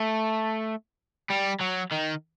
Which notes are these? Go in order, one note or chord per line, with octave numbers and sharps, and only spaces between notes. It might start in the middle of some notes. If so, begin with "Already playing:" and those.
Already playing: A3
G3
F#3
D#3